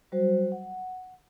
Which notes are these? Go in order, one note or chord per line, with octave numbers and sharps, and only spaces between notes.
F#3 G3 F#4 C5
F#5